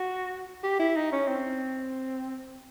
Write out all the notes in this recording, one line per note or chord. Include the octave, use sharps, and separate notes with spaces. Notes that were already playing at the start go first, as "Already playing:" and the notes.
Already playing: F#4
G4
E4
D#4
C#4
C4